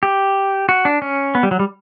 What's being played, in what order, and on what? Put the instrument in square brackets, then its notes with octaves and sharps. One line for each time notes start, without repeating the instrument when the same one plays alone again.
[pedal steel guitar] G4
F#4
D4
C#4
B3
G3
F#3
G3